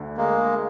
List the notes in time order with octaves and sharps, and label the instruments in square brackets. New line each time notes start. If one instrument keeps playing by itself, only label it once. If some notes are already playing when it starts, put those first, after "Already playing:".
Already playing: [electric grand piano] D2 D3
[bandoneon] G#3 A#3